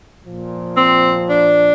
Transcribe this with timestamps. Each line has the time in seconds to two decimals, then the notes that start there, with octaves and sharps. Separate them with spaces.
0.25 A#2 F3
0.77 C4
1.30 D4